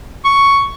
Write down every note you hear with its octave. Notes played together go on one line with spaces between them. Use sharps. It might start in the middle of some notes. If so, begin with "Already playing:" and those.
C#6